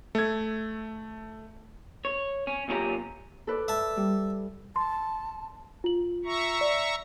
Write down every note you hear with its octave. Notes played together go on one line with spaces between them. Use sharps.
A3 G#6
C#5
C#4
B1 A#2 C#4 E4 G4 A#5
A4 B4 D5
E5 A5
G3
A5 C6
F4 F#7
E5 A#5 C#6
D5